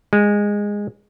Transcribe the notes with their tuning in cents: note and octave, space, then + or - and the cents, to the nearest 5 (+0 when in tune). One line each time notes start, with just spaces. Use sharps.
G#3 -15